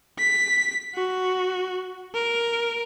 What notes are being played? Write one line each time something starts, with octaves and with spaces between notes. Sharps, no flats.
B6
F#4
A#4